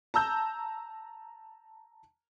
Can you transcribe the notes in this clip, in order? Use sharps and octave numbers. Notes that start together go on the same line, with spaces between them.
A5 A#5 E6 G6